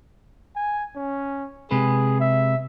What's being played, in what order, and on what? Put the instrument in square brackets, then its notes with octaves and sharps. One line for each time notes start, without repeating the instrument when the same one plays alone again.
[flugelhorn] G#5
C#4
[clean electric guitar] C3 G#3 B4 [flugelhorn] G#4
[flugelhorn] E5